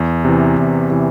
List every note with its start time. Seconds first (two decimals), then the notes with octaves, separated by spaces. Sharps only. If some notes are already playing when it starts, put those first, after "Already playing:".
Already playing: E2
0.25 C3 E3
0.58 E2
0.90 C3 E3